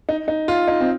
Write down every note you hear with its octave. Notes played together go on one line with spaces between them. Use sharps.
D#4
D#4
F4
D#4
C4